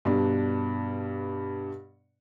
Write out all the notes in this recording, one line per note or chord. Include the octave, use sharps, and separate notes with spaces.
G2 B2 D4